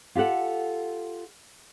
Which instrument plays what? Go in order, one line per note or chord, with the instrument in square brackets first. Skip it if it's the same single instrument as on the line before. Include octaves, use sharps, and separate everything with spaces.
[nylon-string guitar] F4 G4 A4 F#5